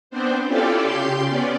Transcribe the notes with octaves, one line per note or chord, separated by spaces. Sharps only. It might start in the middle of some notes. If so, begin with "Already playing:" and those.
B3 C4 D4 C5
C#4 E4 F4 G4 A4 D5
C#3 G4 C6 G6
B3 C#4 D5